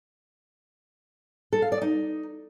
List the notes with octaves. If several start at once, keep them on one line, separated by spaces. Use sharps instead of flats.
A4
F5
D5
D#4